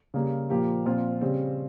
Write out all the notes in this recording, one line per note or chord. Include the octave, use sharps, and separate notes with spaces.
C#3 G3 A#3
A#2 F3 A#3 G4
A#2 F3 C4 F4
C#3 G3 C4